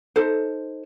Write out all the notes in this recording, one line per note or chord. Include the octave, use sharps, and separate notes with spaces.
D#4 A4 C5